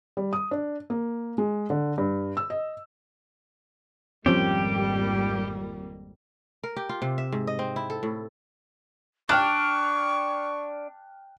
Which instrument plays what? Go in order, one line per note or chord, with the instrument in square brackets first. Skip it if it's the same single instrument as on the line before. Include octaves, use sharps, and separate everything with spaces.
[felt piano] G3
D#6
D4
A#3
G#3
D3
G2
E6
D#5
[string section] G#1 F2 A#3 [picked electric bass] F3 C4 C#4 [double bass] G3 [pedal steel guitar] G4
[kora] A#4
G4
F4
C3
E5
G#2
D#5
C4
E4
A4
A2
[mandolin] D4 [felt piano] G5 F6 F#6 [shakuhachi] C#6